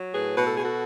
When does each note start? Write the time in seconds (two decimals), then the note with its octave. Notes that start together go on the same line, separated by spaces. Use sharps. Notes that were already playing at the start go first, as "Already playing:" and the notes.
Already playing: F#3
0.14 A2 G#4 B4
0.36 B2 B4
0.46 A4
0.55 B2 G#4
0.64 F#4 A4